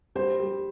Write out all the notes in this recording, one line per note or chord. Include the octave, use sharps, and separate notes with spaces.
G3 C5
G3